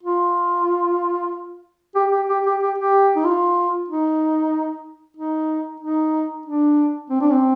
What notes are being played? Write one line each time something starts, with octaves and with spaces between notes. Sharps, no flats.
F4
G4
G4
G4
G4
G4
G4
D#4
F4
D#4
D#4
D#4
D4
C4
D4
C4